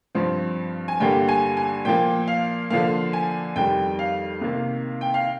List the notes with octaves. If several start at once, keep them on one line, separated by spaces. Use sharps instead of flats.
G2 F3 C4
G#5
G2 D3 G3 A#3 G5
G#5
G#5
A#2 F3 A#3 G5
F5
D3 F3 A#3 F5
G#5
F2 D#3 G3 G5
F5
C3 D#3 A#3
G5
F5